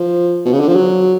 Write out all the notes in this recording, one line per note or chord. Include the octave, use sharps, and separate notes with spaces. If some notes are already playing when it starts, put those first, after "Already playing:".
Already playing: F3
B2
C#3
D3
F3
F#3